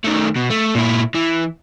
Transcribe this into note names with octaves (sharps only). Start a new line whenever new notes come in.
D#3 A3
B2
A3
A#2 E4
E3